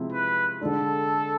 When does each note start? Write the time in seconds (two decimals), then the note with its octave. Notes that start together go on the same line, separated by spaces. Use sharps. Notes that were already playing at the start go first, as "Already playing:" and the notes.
Already playing: C3 F3 G#3 C4 E4
0.12 B4
0.61 D3 G#3 D4 A4